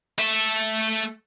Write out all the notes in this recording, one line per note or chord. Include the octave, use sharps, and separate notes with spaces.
A3 E5